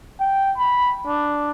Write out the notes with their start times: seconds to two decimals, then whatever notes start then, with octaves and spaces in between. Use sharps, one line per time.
0.20 G5
0.57 B5
1.07 D4